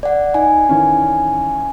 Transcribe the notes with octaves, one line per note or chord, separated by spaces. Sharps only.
D5 F#5
D#4 G#5
D#3 E3 C#4